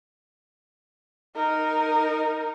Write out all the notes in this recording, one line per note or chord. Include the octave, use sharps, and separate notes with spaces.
D#4 A#4